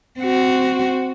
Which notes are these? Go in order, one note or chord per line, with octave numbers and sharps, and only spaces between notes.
C4 F#4